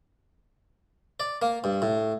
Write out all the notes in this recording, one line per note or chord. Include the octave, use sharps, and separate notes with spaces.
D5
A#3
G2
A2